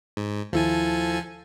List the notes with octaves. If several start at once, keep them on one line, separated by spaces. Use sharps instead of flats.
G#2
D#2 F3 E4 A4 G#5